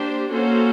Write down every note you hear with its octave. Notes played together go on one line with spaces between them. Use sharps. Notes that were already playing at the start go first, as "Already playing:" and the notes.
Already playing: A#3 D4 G4 C5
A#3 C#4 F#4 A4 C5